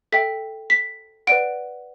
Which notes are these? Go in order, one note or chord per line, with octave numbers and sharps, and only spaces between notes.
A4 E5 G5 B6
B6
B4 D5 F#5 D7